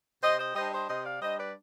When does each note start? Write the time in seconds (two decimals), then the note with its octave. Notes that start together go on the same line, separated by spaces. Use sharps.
0.23 C3 C5 D#5
0.39 C5 D#5
0.55 G3 D4 C5 D#5
0.72 C5 D#5
0.88 C3 C5 D#5
1.05 D5 F5
1.21 G3 D4 C5 D#5
1.38 B4 D5